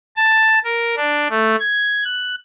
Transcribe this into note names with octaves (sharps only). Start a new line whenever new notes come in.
A5
A#4
D4
A3
G#6
F#6